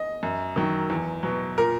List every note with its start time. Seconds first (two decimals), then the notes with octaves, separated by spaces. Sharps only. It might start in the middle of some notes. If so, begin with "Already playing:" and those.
Already playing: D#5
0.23 F#2
0.56 D#3 F#3
0.90 E2
1.23 B2 F#3
1.58 A#2 A#4